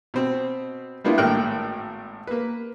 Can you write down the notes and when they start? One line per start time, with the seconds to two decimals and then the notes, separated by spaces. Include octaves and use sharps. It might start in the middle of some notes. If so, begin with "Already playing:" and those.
0.14 B2 C4
1.04 G3 A#3 B3 D4 E4 F4
1.18 G#1 A2 A#3 G5 F6 F#6
2.27 A#3 B4